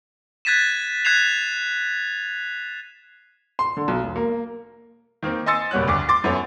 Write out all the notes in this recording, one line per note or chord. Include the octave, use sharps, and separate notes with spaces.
F#6 G#6 A6 B6 D#7 E7
F#6 G#6 C7 E7 F7
C6
D3
B1
E1
A#3
D#3 A#3 C4
D#5 G#5 C6 E6 A6 C#7
F#1 B2 G3 B3 C#5 F#6
D2 G2 D6
C6 D6 A6
F#2 A3 B3 C#4